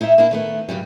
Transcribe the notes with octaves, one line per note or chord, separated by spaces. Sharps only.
D#4 E4 C5 E5
A#3 D4 E4
D#3 A3 B3
G2 C#3 F#3 G3